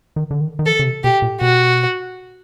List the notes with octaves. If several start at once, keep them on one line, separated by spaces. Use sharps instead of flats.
D#3
D3
D#3
D#3
E3 A4
C#3
C3
B2 G4
A#2
B2 F#4